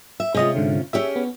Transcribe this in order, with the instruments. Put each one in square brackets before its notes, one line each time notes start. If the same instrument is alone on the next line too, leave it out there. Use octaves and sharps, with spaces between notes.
[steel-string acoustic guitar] E5
[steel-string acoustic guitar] C3 C#4 F4 [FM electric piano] G#3 D#5
[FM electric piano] G#2 D3
[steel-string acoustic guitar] C#4 G4 G#4 [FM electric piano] E5
[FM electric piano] B3